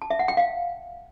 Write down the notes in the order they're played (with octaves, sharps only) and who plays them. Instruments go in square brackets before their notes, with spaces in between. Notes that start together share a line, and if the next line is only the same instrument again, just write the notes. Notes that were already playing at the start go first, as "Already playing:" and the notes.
[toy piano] A5
E5
F#5
G5
F5